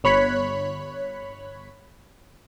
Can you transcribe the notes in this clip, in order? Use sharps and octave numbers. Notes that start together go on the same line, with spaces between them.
G1 C#5 B5 F#6 B6 C#7